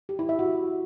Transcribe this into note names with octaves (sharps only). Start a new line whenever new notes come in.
G4
E4
E5
F#4